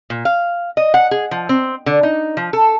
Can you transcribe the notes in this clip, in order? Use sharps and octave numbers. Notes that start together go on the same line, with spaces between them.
A#2
F5
D#5
F#5
G#4
F3
C4
D3
D#4
F3
A4